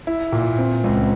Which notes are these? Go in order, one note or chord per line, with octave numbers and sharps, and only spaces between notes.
E4
A#2
C4
C#2